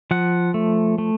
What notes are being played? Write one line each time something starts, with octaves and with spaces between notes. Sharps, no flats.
F3 F#5
A3
A3